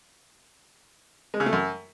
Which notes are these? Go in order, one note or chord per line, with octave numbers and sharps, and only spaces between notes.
G#3
C#3
A3
F#2